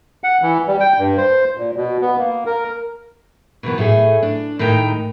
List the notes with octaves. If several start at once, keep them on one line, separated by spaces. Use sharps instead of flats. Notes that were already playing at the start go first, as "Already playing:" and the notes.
F#5
E3
G3
G5
G2
C5
A#2
B2
B3
A#3
A#4
B2 D#3 E3 B3
A2 A3 G#4
D4
A2 D#3 G#3 D#4 G5 A#5